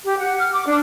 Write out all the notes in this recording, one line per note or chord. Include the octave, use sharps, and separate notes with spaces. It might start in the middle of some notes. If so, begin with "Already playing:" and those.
G4
F#5
F6
D6
D4